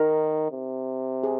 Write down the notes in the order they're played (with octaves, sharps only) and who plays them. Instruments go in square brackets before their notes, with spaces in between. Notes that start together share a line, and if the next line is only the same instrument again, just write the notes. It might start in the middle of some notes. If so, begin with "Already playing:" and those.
Already playing: [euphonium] D#3 [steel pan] D#4 A#4
[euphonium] C3
[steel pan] G#4